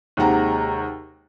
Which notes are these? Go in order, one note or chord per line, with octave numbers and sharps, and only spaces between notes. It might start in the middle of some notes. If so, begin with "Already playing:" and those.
D#2 C3 G#3 F#5 A#5